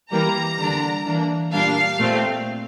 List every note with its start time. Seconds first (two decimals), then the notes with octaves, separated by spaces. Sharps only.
0.11 E3 G3 A#3 A#5
0.58 D3 G3 D4
1.05 E3 A#3 D4
1.52 A#2 G3 A#3 D4 F5
1.99 A#2 A3 C4